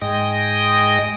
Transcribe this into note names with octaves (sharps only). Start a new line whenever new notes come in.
G#2 G#3 D#5 G5 D#6